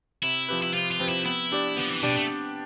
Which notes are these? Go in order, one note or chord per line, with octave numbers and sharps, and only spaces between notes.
C3 E4
F3 C4 G4 B4
E4
C3 F4
F4
F3 C4 G4 B4
E4
B3 E4
D4 G4 D5
F3 B3
E3
B2 D4 G4 D5
A3